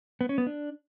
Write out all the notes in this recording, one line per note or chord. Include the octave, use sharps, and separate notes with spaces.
B3
C#4
B3
D4